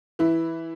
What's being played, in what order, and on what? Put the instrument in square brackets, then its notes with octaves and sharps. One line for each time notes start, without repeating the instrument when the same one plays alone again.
[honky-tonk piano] E3 E4